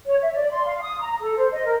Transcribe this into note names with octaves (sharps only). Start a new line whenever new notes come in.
C#5
E5
D5
C6
F5
D#6
A#5
A4
C5
D#5
A#4